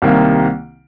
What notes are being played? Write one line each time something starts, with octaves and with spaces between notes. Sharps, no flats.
C2 C3 D#3 A#3